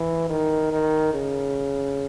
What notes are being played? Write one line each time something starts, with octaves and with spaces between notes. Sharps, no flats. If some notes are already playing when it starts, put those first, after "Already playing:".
Already playing: E3
D#3
D#3
C#3